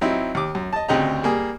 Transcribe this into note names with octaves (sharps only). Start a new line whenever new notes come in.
F#3 C4 D#4 E4
D#2 D6
F#2
D#5 A5
D2 C#3 C4 G4 D#5 A#5
G3 A#3 G#4